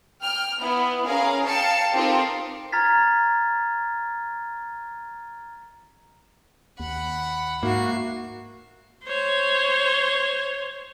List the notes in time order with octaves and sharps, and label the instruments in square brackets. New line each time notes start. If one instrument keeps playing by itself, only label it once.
[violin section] G5 F6
B3 E4
C#4 G#4 A#4 F5
F5 G5 A5 C#7
C4 D#4 F4 G4 A4 A#4
[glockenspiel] A#5 F6 G#6 A6 B6
[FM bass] D#2 [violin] F#5 B5
[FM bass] G#2 [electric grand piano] A#3 [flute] F#4 [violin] E5 C7
[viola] C5 C#5